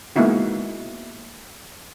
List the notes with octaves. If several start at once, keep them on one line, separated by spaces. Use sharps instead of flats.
G#3 A#3 B3 D#4 E4 F#4